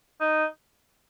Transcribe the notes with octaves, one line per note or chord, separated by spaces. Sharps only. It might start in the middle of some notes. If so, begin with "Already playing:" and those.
D#4